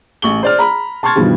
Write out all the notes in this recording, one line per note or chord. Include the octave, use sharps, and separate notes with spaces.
A1 C#6 F#7 G7
C5 D5 F6
A#5 B5
A5 C6 C#6 F6 G#6 A6
G2 B2 D#3 F3 G3